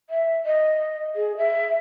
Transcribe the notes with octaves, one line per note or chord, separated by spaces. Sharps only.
E5
D#5
G#4
E5